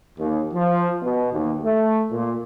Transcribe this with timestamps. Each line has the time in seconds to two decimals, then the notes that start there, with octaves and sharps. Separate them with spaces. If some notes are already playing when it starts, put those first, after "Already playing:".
0.18 D#2
0.53 F3
1.02 B2
1.31 D#2
1.64 A3
2.10 A#2